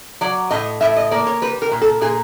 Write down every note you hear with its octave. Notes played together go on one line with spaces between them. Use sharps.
F#3 D5
A2 D#5
A2 E5
D#5
A#3 D5
C#5
G3 B4
A#4
A#2
A4
A#2 G#4